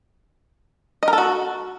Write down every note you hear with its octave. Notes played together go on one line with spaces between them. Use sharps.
D#5
A#4
A4
F#4